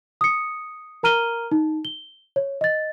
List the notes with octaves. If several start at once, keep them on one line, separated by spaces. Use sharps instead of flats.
D#6 C#7
A#4 A#5 F6 D#7 G7
D#4
G7
C#5
D#5 A6